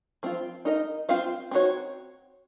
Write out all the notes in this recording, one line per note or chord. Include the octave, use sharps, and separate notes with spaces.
F3 C4 F4
D#4 A#4 D#5
C4 F4 C5 F5
C4 D#4 F#4 C#5